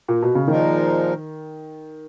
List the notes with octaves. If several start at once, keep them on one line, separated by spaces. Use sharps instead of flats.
A#2
B2
C#3
A#2 D#3 F3 G#3 D#4 A#4